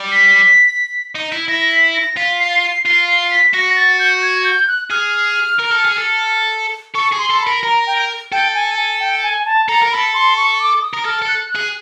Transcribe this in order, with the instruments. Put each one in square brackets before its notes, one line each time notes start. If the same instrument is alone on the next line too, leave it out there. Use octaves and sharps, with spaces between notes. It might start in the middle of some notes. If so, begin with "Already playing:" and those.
Already playing: [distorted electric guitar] G3
[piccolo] B6
[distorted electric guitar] D#4
E4
[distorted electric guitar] E4 [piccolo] A#6
[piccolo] B6
A#6
[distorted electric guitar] F4 [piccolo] B6
[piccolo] C7
C7
[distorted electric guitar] F4 [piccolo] C7
[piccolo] C7
B6
[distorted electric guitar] F#4 [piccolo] A#6
[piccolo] A6
G6
G#6
G6
F#6
[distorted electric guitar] G#4 [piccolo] F6
[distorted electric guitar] A#4
A4
G#4
A4
[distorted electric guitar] A4 [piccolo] C#6
[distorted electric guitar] G#4
[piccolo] C6
[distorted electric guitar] A4
[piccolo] B5
[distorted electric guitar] A#4
[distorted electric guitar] A#4 [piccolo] A#5
[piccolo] G5
[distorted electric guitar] A4 [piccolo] G5
[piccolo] G#5
G#5
G5
G#5
A5
[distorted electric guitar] A4 [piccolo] A#5
[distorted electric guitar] A#4
[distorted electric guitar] A4 [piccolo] B5
[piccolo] C6
C#6
D6
D#6
[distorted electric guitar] A#4
[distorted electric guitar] A4 [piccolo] F6
[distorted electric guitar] A4
[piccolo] F#6
F#6
[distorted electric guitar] G#4